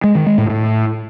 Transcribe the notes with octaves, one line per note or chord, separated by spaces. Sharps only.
G#3
D#3
G#3
A2
A2